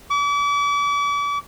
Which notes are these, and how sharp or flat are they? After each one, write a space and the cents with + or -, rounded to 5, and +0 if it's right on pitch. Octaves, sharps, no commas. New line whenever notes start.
D6 -40